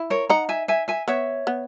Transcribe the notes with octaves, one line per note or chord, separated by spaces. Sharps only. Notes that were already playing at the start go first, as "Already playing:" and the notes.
Already playing: E4
A#4 C#5
D#4 F#5 A#5
E5 G#5
E5 G#5
E5 G#5
B3 C#5 E5
B3